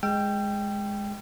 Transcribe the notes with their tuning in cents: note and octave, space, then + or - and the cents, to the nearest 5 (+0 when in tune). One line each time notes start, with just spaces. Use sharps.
G#3 -5 G5 +0 E6 +45